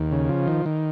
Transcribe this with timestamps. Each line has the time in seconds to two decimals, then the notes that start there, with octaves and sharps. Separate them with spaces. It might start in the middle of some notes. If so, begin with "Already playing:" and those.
Already playing: D#2
0.12 C#3
0.29 F3
0.48 D#3
0.66 D#3